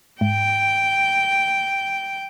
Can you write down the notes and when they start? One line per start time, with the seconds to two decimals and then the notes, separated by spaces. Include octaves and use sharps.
0.21 G#2 G5